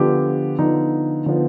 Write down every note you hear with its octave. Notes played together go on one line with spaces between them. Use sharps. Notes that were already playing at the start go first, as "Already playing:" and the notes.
Already playing: D3 F3 B3 G4
D3 F3 B3 D#4
D3 F3 B3